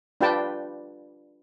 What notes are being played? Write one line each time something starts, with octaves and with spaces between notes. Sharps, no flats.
D4 F4 G4 B4 G5 A5